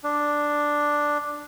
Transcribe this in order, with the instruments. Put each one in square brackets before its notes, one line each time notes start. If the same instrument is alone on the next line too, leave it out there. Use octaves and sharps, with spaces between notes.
[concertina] D4